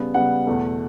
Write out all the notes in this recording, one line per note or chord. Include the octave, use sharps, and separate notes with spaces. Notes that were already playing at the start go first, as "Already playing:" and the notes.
Already playing: C#3 G3 B3
C#3 G3 B3 F#5
E2 B2 A3